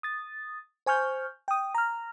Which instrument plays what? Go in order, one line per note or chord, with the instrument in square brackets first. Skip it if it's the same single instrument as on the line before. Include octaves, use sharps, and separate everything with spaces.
[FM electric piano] D#6 A6
C5 G#5 C#6 F6 G6
G5 D#6
A#5 F6